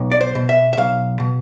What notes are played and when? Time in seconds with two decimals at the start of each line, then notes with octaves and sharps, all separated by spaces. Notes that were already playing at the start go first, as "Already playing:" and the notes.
Already playing: B1
0.11 D5
0.21 C5
0.35 B2
0.49 E5
0.73 E5
0.77 B1 F5
1.20 B2